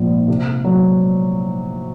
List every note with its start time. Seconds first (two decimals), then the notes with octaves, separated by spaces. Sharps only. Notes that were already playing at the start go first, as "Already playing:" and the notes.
Already playing: A#1 G#2
0.28 C3
0.64 F#3